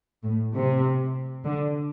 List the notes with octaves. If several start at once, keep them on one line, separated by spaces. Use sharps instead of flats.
A2
C3
D3